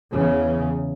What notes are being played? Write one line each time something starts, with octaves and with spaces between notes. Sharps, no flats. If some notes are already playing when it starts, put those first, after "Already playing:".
E2 C#3